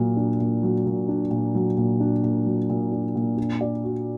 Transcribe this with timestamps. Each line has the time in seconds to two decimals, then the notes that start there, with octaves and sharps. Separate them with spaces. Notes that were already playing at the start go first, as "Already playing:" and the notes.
Already playing: A#2 F#3
0.17 D4
0.40 A#2
0.63 F#3
0.86 A#2
1.08 D4
1.31 A#2
1.55 F#3
1.77 A#2
2.00 D4
2.23 A#2
2.46 F#3
2.70 A#2
2.92 D4
3.15 A#2
3.37 D4
3.61 D5
3.83 F#4